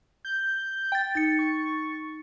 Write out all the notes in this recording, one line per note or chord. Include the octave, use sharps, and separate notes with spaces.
G6
G5 A6
D#4 A6 C#7
C#6